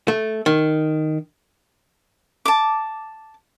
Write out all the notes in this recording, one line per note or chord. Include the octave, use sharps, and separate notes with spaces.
A3
D#3
A5 D6